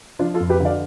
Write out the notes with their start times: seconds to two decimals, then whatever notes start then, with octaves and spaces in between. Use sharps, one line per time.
0.19 F3 D4 F4
0.34 F4 A4
0.40 F2
0.49 G4 B4
0.60 D3 D5 F5